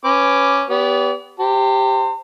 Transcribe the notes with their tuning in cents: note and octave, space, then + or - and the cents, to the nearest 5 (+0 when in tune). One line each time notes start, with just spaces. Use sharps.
C#4 +0 B4 +15 D6 +0
B3 +0 G4 +0 D5 -45
G4 +0 C5 +0 A#5 -45